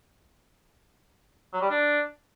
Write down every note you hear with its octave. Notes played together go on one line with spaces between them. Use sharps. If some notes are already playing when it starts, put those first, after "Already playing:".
F#3
G3
D4